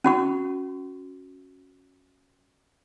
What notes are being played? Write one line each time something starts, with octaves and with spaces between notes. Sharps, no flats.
C#4 F#4 C#6